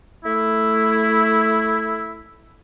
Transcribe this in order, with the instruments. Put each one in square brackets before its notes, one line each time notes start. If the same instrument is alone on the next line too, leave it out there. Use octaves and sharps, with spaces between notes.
[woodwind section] A3 E4